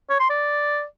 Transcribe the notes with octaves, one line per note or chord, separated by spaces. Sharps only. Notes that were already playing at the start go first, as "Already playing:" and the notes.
C#5
C6
D5